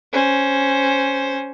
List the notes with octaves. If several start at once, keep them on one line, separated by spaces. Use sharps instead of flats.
C#4 C5